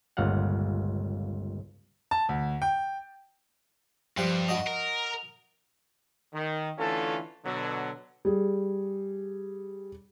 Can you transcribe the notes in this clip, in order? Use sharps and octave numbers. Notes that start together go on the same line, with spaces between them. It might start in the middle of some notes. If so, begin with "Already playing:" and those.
G1 C#2 A#2 F5 F#5
A5
D2
G5
G2 F3 G3 C6
F#4 D#5
A#4
D#3
D3 E3 A3 C#4 F4 A4
B2 D3 F#3
G3 G#4